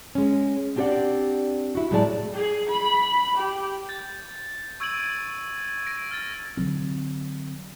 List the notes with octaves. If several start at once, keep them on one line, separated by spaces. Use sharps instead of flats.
G#3 C#4
C4 D4 G4 A4 D5 F#5
E4 F#4
A2 F#3 G#3 G#4 D5 A5
G#4
B5
G4
G6 A6
C#6 E6 G#6 D7 D#7 F#7
A#6 D7
F6 A6
D3 F#3 C4